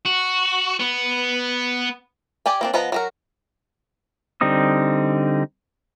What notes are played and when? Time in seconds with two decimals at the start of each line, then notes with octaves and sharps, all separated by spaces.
0.06 F#4
0.79 B3
2.46 G4 D5 G5 G#5
2.61 A#3 C4 D4
2.74 F3 B3 D#5 F#5 A#5
2.92 F#3 F#4 A#4
4.41 D3 G3 C4 D#4 D#6